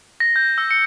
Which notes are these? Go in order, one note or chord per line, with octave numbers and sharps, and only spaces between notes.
A#6
G6
E6
C#7